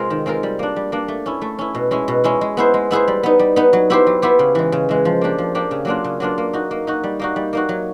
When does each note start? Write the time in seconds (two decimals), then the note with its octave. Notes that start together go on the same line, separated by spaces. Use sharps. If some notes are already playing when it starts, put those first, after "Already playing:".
Already playing: C3 G#3 C4 F4 A#4
0.10 D#3
0.26 G#3 C4 F4 A#4
0.43 G3
0.59 A#3 D4
0.76 G3
0.92 A#3 D4
1.08 A3
1.26 C#4 E4
1.41 A3
1.59 C#4 E4
1.75 B2
1.91 G#3 C#4 E4
2.08 B2
2.24 G#3 C#4 E4
2.41 G#3
2.57 B3 E4 G#4 C5
2.74 G#3
2.91 B3 E4 G#4 C5
3.08 G3
3.23 B3 D#4
3.39 G3
3.56 B3 D#4
3.73 F#3
3.90 B3 E4 G4 C5
4.07 F#3
4.22 B3 E4 G4 C5
4.39 C#3
4.55 E3 G#3
4.72 C#3
4.89 E3 G#3
5.05 F3
5.21 A#3 D4 G4
5.38 F3
5.55 A#3 D4 G4
5.71 C#3
5.85 F#3 A#3 D4 F4
6.04 C#3
6.20 F#3 A#3 D4 F4
6.38 A#3
6.53 D#4 F#4
6.71 A#3
6.87 D#4 F#4
7.04 G3
7.19 A#3 D#4 F#4
7.36 G3
7.53 A#3 D#4 F#4
7.69 F#3